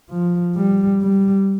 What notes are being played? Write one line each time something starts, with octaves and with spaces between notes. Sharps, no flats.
F3
G3
G3